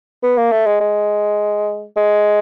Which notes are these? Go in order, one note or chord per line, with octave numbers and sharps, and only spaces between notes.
B3
A#3
A3
G#3
G#3
G#3